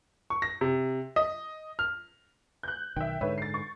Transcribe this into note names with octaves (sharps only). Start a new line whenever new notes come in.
C#6
A#6
C3
D#5
F6
F#6 G6
B1 D#3 E5 G5
G#2 D3 B4 C#5 E5
A6 C7
C#6